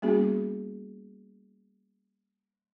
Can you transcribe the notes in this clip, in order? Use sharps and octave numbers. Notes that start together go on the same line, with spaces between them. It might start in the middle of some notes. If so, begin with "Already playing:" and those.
G3 A#3 B3 C#4 F#4 G#4